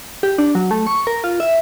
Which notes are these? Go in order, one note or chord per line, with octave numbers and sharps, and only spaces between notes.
G4
D4
F#3
A3
C#6
A#4
F4
E5